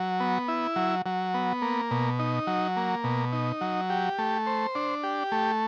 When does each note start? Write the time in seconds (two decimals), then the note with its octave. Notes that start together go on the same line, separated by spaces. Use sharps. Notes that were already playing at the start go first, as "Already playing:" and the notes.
Already playing: F#3
0.20 B3
0.48 E4
0.76 F#3
1.06 F#3
1.34 B3
1.62 A#3
1.91 B2
2.19 D#4
2.47 F#3
2.77 A#3
3.04 B2
3.33 D#4
3.61 F#3
3.90 G4
4.18 A3
4.46 C5
4.75 D4
5.03 G4
5.32 A3